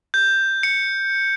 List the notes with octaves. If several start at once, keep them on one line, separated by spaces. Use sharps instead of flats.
G6
C#7